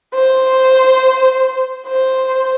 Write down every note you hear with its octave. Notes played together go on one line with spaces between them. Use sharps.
C5
C5